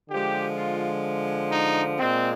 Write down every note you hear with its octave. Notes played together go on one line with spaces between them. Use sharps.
D3 F3 G#3 G4
F4
D#4
A#2 G#3 C4